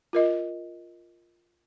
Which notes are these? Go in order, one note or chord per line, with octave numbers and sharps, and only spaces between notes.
F4 A#4 D#5